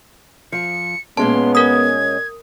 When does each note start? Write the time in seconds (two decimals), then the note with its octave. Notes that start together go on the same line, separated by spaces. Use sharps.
0.52 F3 C#7
1.17 A#2 G#3 B3 C#4 A5 C6
1.55 A#4 D#6 G#6